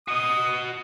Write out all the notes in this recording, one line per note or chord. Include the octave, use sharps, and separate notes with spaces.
F#4 D#5 D#6